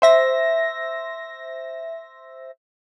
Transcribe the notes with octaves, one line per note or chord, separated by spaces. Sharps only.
C5 E5 A#6